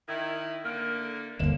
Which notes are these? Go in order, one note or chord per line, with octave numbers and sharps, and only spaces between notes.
D#3 E4 G#6
D3 A3 A#3 F6 D7
G1 D#2 D3 A#3 E7